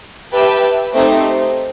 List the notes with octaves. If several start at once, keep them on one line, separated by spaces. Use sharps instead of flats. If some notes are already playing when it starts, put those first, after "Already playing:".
G4 B4 E5 A5
A3 C4 D#4 G4